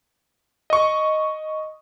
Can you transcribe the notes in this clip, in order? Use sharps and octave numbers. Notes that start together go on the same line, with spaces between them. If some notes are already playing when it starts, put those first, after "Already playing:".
D#5 C#6